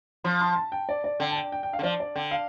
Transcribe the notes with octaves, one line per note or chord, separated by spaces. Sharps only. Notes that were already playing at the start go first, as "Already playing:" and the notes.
F3 C6
C6
A5
G5
D5
D5
D3 G5
A5
G5
G5
G5
F5
D3
F3 D5
D5
D3 G5
F5